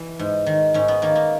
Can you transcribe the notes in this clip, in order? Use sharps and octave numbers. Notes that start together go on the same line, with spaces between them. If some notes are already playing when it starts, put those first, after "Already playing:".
Already playing: E3
G#2
D#3
G#2 C#4
B3
D#3 A#3
A#3